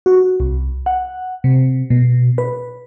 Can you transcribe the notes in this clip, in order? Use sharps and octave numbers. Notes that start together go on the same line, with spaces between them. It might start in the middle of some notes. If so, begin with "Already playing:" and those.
F#4
C2
F#5
C3
B2
B4